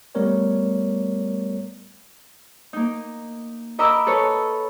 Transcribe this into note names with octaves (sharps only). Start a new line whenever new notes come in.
G3 A3 B3 A#4 C#5 D5
A#3 D#4
A#4 D#5 A#5 B5 D6 E6
A4 B4 C#5